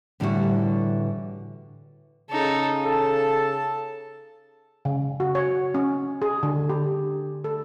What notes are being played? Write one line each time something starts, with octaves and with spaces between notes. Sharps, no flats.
A2 D3 E3 G3 E4 F#4
C#3 D#4 A4
A4 A5
C#3
F#4
C#5
C#4
G#4
D3
G4
A4